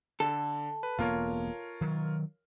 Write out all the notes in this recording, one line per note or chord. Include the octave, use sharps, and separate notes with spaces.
D3 A4
B4
E1 A#3 B3 F4 A#4 C#5
D#3 F#3